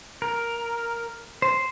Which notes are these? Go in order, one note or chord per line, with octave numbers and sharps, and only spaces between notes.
A#4
C5